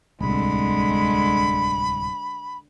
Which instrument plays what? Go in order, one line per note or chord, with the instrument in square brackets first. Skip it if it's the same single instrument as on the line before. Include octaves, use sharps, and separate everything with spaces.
[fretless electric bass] D1 C2 [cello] D3 G#3 [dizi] B5